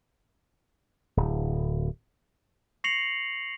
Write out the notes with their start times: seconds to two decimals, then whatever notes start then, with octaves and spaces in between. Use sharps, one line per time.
1.17 D1
2.84 C#6 A#6 C7 C#7 F7 F#7